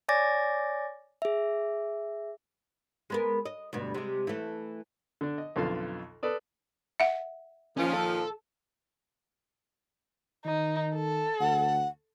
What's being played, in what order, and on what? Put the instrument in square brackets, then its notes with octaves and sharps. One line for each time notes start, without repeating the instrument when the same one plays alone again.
[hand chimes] C#5 D5 G#5 D6 A6 A#6
G#4 E5
[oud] G#3 B3 A#4
D#5
D2 G2 B2
C3 G#3
E3 A3
[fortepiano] D3 D4
D#5
B1 F2 D3 F4 A4 F5
A4 B4 D5 D#6
[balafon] E5 F#5
[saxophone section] A#2 D#3 F3 [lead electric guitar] C#4
[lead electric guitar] A4
[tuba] D#3 [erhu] D#4
[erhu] A4
[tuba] D2 [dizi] F#5